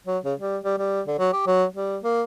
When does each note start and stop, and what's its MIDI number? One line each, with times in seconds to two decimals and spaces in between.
0.07 0.18 54
0.25 0.34 49
0.40 0.57 55
0.64 0.76 55
0.78 1.01 55
1.07 1.18 50
1.19 1.31 54
1.33 1.42 67
1.46 1.65 54
1.75 1.97 55
2.03 2.23 58